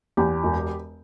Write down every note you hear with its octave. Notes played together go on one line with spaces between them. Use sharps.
E2 G4
E1